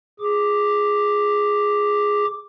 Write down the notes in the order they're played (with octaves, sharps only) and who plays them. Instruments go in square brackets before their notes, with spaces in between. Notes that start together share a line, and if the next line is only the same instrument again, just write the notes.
[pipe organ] G#4 D6